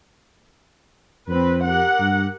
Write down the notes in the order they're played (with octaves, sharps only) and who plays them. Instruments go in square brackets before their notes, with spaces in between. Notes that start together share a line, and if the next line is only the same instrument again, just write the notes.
[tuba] F2 [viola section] C4 B4
[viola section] G4 A#4 F#5
[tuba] G2